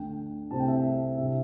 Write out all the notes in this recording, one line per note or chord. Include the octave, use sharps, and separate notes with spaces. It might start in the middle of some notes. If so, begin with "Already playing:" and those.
Already playing: D2 D3 A3 D4 G5
C2 C3 A3 C4 A5
G5
E5
C2 C3 G3 D4 E5